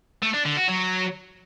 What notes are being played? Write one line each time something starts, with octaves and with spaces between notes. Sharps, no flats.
A3
D4
D3
F#4
F#3